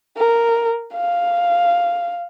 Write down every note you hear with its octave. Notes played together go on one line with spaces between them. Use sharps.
A#4
F5